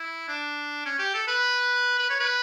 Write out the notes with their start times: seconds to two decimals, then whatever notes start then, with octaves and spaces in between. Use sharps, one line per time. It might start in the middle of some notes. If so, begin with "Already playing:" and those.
Already playing: E4
0.28 D4
0.86 C#4
0.99 G4
1.14 A4
1.27 B4
1.99 B4
2.10 C#5
2.20 B4